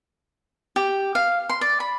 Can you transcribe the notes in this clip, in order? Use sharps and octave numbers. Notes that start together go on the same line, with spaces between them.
G4
F5
C6
D5
B5